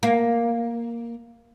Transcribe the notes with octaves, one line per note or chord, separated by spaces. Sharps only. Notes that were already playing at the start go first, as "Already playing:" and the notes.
A#3